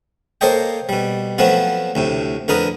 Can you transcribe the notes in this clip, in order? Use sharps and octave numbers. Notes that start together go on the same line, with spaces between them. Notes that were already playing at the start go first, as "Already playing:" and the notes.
A#3 A4 C5 C#5 D#5 G5
B2 G3
F3 F#3 A3 B3 C4 F#4
D2 A2 C3
F2 D3 A#4 B4 D#6